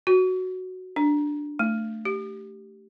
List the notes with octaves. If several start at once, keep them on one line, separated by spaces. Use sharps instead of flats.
F#4
D4
A3
G4